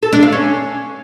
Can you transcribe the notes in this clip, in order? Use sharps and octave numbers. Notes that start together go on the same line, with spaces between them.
A4
D4
F5
C#4